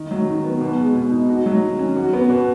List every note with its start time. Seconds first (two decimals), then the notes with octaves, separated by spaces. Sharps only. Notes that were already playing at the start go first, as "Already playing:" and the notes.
Already playing: D#3 D#4
0.11 F#3
0.28 D#3
0.44 B3
0.61 B2
0.78 G#3
0.95 B2
1.12 D#4
1.28 F#4
1.46 F#3
1.62 D#3
1.79 C#4
1.96 F#4
2.13 B3
2.30 B2